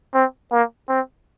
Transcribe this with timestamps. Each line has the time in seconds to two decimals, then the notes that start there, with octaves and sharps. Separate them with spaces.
0.14 C4
0.51 A#3
0.89 C4